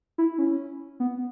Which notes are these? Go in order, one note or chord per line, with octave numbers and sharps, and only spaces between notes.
E4
C#4
B3